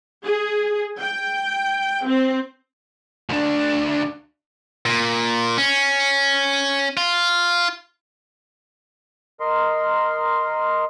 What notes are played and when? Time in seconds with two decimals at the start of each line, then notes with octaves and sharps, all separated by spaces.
0.24 G#4
1.00 G5
2.07 C4
3.29 D2 D4
4.86 A#2
5.58 C#4
6.97 F4
9.40 A#4 D#5 C6